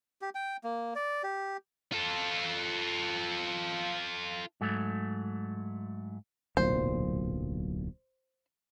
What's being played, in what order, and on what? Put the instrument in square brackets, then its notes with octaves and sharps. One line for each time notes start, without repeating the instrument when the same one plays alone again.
[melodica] G4
G5
A#3
D5
G4
[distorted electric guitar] F4 A4
[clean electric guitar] G#2 F#3 A3
[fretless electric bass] D1 B1 A#2 [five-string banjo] C5